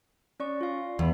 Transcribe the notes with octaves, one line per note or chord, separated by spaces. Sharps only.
C#4 D5 C#6
F4 F5
E2 B3 B5